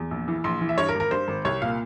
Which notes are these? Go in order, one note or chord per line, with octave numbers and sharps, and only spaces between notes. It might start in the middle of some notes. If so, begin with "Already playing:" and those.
Already playing: E2
A#1
E3
A#1 C6
E3
E5
G2 C#5
A#4
G#1
A#4
G2 C5
G#1
C2 C#5
A#2 F5